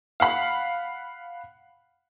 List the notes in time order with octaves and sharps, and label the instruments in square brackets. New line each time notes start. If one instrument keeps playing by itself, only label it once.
[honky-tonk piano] F5 F#5 B5